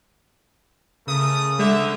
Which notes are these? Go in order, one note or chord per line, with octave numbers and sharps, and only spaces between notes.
C#3 A3 A#4 D#6
D3 G#3 E5